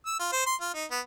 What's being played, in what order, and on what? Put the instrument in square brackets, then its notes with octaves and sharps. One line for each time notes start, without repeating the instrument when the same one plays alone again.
[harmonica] E6
F4
C5
C6
F4
D#4
B3